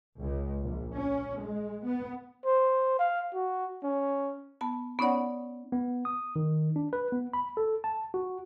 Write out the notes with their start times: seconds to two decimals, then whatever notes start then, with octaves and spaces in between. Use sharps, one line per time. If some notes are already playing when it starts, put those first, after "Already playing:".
0.20 C#2
0.62 A#1
0.95 C#4
1.40 G#3
1.85 B3
2.45 C5
2.99 F5
3.34 F#4
3.83 C#4
4.61 B3 A5
4.99 B3 C#4 D#4 C#5 D5 F#5
5.72 B3
6.05 D#6
6.36 D#3
6.76 D4
6.93 B4
7.12 B3
7.34 B5
7.57 A4
7.84 A5
8.14 F#4